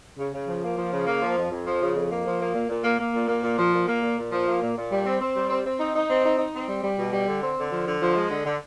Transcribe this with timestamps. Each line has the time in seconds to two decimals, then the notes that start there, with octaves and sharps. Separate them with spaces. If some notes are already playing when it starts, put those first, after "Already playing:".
0.19 C#3
0.33 C#3
0.47 F3
0.63 A#3
0.77 F3
0.92 C#3
1.07 A#3
1.22 F3
1.37 F2
1.51 F2
1.66 F3
1.81 C#3
1.96 F2
2.11 A#3
2.25 F3
2.40 A#3
2.54 A#2
2.69 A#2
2.84 A#3
2.99 A#3
3.13 A#2
3.28 A#3
3.43 A#2
3.58 F3
3.73 A#2
3.88 A#3
4.02 A#2
4.17 A#2
4.31 F3
4.46 A#3
4.62 A#2
4.76 A#2
4.92 G3
5.05 C4
5.21 C4
5.35 G3
5.50 C4
5.65 C4
5.80 D#4
5.94 D#4
6.09 C4
6.25 D#4
6.38 D#4
6.54 C4
6.68 G3
6.83 G3
6.98 B2
7.12 G3
7.27 D3
7.42 C4
7.57 D3
7.72 F3
7.86 D3
8.01 F3
8.16 G#3
8.30 D3
8.45 D3